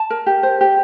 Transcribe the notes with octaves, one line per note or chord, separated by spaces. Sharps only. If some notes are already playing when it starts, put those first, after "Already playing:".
Already playing: A5
A#4
G4
C5
G4